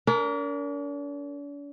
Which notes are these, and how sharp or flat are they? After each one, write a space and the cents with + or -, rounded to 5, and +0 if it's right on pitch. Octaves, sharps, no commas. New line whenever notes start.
D4 -45 A#4 +0